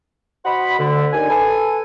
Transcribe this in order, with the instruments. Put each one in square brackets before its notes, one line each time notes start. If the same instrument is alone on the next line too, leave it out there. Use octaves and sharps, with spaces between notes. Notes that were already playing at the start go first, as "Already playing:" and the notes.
[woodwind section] F#4 C5 D#5 F#5 B5
D2 D3
D#2 D3 G#5
A4 B4 G#5